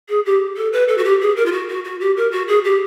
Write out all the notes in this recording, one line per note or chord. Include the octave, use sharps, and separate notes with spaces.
G#4
G4
A4
B4
A4
F#4
G4
G#4
A#4
F4
F#4
F#4
F#4
G4
A#4
F#4
G#4
G4